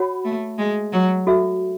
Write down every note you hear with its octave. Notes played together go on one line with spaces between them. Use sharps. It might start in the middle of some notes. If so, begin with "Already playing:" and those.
Already playing: F#4 C#5 F#5 B5
A3
G#3
F#3
F#4 A4 E5